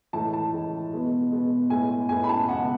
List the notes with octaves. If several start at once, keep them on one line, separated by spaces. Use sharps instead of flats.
A2 E3 G#3 A5
A5
A2 E3 G#3
B2 G#3 B3
B2 G#3 B3
A2 G#3 B3 G#5
A2 G#3 B3 G#5
B5
A5
C#2 B2 G#3 F#5